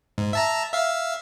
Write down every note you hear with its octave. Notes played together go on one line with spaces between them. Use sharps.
G#2
E5 A5 A#5
E5 F5